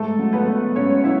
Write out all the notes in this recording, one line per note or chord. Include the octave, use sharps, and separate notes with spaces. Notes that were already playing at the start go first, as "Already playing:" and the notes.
Already playing: G#2 A3 A4
F#3
B3 B4
F#3
G#2 C#4 C#5
F#3 E4 E5